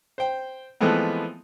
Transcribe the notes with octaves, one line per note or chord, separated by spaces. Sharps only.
C5 G5
E3 F3 G#3 A3 B3 C4